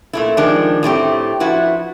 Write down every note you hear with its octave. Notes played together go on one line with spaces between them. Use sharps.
A#2 A3 E4
D#3 F3 G#3 D4
A2 A3 C4 G4
F3 E4 F#4 B4